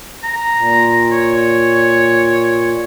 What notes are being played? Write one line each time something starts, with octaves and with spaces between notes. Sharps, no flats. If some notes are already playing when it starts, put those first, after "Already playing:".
A#5
A#2
C#5